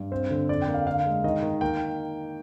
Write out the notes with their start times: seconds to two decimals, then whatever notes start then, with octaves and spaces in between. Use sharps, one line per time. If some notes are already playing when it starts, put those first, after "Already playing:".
Already playing: G2
0.11 C4 C5
0.30 D3
0.49 F2 D5
0.62 G5
0.67 A#3
0.74 F5
0.86 D3 F5
1.06 G#3
1.24 D#3 D#5
1.42 D#3
1.61 A#3 G5